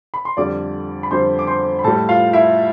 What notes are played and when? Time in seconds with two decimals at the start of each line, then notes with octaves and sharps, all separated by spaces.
0.14 B5
0.25 C6
0.37 F2 D3 G3 D5 D6
1.03 B5
1.11 F2 D3 G3 C5 C6
1.39 D6
1.47 C5 C6
1.79 B5
1.84 A2 G3 A4 A5
2.09 F4 F5
2.33 E4 E5